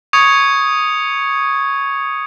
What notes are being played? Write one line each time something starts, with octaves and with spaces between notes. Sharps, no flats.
C#6 D#6 G#6 C#7